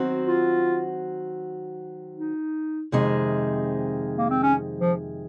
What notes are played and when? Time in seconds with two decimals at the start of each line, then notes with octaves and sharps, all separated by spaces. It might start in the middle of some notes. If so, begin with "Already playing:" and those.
Already playing: D#3 F#3 C4 F#4
0.28 F4
2.17 D#4
2.92 F2 C3 D#3 G#3
4.17 A#3
4.30 C4
4.43 C#4
4.81 F3